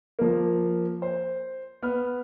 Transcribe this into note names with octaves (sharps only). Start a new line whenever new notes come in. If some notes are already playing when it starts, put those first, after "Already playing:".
F3 A#3
C5
B3 F6